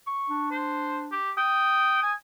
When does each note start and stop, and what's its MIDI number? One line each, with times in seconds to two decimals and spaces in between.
0.07 0.50 85
0.29 1.17 62
0.51 1.03 72
1.12 1.32 67
1.37 2.02 79
1.37 2.12 87
2.03 2.14 80